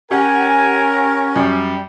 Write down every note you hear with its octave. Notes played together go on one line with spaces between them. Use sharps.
C#4 G4 A#4 F#5 G#5
F#2 G3